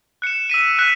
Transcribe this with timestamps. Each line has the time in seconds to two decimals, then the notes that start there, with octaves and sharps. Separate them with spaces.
0.22 F#6 C#7 E7
0.50 E6 B6 D#7
0.79 F#6 B6 D#7